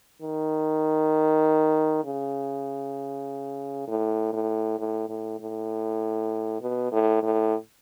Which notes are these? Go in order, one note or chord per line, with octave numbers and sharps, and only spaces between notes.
D#3
C#3
A2
A2
A2
A2
A2
B2
A2
A2